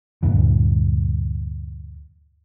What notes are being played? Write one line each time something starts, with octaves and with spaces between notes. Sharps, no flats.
D2 G2 A#2 E3